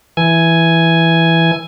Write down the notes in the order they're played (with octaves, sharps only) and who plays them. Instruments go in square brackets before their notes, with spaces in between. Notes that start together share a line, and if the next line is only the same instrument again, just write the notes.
[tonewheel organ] E3 G#5